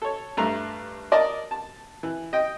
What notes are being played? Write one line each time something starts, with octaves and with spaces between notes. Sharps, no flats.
A4 C#5
G2 A3 A#5
A#4 D5 D#5 A5
A5
E3
D#5 G5